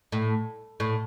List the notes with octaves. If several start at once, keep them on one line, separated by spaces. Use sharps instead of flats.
A2
A2